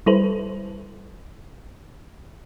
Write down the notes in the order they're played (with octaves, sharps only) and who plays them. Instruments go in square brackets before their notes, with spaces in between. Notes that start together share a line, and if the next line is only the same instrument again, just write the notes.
[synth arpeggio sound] G3 E4 A4 B4 C5